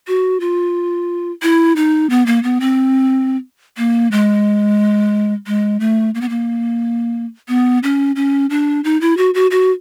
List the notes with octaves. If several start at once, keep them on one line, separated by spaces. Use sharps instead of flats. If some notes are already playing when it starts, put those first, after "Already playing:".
F#4
F4
E4
D#4
B3
A#3
B3
C4
A#3
G#3
G#3
A3
A#3
B3
A#3
B3
C#4
C#4
D4
D#4
E4
F#4
F#4
F#4